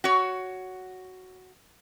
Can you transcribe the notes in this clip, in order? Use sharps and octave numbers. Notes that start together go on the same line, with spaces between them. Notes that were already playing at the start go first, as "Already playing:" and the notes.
F#4 C#5